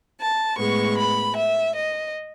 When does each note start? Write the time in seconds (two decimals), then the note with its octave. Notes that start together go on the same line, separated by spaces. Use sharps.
0.18 A5
0.56 A2 G#3 B3 C#6
0.96 B5
1.35 E5
1.75 D#5